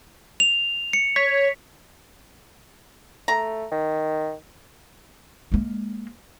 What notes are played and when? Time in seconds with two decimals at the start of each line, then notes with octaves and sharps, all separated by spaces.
0.40 F7
0.93 C#7
1.16 C#5 B6
3.28 A3 A#5
3.72 D#3
5.52 G#3 A#3